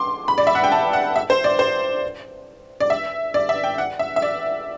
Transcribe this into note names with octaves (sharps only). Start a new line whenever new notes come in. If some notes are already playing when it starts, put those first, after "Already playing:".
Already playing: C6 D6
B5
D5
E5
F#5
G5
A5
F#5
E5
C5
D5
C5
D5
E5
D5
E5
G5
F#5
E5
E5
D5